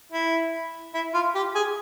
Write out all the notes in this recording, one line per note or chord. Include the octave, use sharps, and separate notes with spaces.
E4
E4
F4
G4
G#4